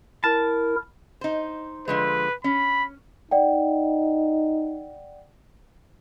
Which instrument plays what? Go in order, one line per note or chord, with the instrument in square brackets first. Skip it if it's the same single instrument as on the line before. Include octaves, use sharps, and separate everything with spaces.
[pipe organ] E4 A#4 [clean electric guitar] A5
[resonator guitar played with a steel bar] D#4 C5
[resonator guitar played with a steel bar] D3 F3 G#3 [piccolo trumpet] B4
[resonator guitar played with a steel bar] C#4 [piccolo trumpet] B5
[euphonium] D#4 [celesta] D5 F#5 G5